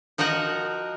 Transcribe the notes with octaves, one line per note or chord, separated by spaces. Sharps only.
F3 D#4 F#4 A#4 F#5